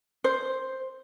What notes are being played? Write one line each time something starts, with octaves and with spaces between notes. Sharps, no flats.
C5